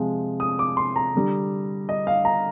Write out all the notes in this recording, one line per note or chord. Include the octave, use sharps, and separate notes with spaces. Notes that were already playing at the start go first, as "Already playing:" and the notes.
Already playing: C3 F3 G#3
D#6
D6
C6
A#5
D3 G3
D#5
F5
A#5